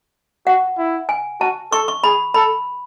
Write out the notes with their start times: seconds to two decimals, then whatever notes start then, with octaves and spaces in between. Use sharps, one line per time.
0.47 F#4 F#5
0.78 E4
1.09 G#5
1.41 F#4 A5
1.72 A4 C#6
1.88 C#6
2.04 G#4 B5
2.34 A4 B5